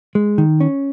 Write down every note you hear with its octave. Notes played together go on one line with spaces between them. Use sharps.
G#3
D#3
C#4